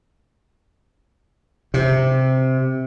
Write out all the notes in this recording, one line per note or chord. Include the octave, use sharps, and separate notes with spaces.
C3